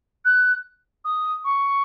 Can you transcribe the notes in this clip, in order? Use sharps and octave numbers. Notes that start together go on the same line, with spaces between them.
F#6
D#6
C#6